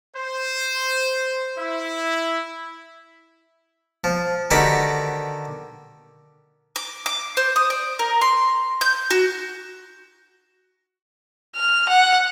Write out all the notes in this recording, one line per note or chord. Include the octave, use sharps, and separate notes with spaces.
C5
E4
F3
D3 D#3 D#4 F#4 G4 B4
D6
D6
C5
D#6
D5
A#4
C6
G6
F#4
F6
F#5